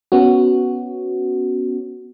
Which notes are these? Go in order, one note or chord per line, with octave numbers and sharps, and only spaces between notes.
B3 C#4 F#4